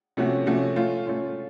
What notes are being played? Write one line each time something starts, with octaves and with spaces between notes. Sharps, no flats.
C3 F3 A3 C#4 F#4
C3 F3 A3 C#4 F#4
A3 C#4 F4
A3 C#4 F4